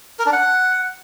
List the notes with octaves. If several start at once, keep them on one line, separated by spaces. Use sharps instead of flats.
A#4
D4
F#5